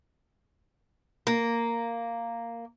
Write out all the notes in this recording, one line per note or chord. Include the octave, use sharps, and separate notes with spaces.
A#3